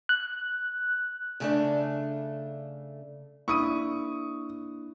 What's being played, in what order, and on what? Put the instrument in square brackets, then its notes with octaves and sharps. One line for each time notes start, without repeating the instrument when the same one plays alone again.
[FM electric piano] F#6
[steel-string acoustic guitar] C#3 A3 D4
[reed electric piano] A#3 D4 [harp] E4 [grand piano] C#6 D#6 D#7